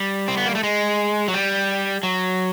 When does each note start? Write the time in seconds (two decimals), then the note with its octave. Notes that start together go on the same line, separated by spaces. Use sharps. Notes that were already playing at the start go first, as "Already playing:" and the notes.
Already playing: G3
0.28 C4
0.37 B3
0.46 A#3
0.55 A3
0.63 G#3
1.28 F#3
1.34 G3
2.03 F#3